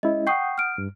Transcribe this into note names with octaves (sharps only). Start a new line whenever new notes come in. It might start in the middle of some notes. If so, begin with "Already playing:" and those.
G#3 C#4 E4 D#5
F#5 G5 C#6 D#6 G6 C7
F6 D7
G2